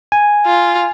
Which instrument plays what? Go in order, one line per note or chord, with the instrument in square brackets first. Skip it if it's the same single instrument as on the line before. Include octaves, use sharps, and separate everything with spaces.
[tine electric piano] G#5
[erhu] F4